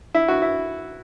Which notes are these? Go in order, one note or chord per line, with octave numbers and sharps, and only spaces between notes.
E4
F#4
E4